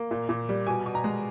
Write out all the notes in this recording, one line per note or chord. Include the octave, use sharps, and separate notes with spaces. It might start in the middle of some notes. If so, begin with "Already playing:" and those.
Already playing: A#3
A#2
A#2
G3
B2 G#5
B2
A#5
G#3